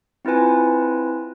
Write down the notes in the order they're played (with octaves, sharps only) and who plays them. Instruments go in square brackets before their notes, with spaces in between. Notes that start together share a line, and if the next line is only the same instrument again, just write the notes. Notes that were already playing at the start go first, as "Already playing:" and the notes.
[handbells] C4 E4 F4 B4 G#5